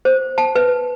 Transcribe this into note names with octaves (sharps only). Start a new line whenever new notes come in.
C5
A5
B4